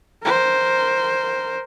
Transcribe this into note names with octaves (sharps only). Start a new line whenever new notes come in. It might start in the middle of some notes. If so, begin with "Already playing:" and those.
A#4 C5